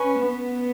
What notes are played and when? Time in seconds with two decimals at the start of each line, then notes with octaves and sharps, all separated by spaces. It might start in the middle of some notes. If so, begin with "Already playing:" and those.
Already playing: C#4 B4
0.24 B3